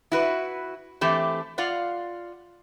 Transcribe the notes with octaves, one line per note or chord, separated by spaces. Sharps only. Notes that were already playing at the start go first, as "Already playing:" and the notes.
E4 F#4 B4
E3 A3 C4 G4
F4 D5 F5 F#5